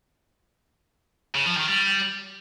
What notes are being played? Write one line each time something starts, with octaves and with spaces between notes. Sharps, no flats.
C#3
F3
D#3
G3